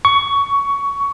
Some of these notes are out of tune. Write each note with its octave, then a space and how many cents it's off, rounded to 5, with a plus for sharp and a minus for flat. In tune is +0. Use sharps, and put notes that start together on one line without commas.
C#6 +15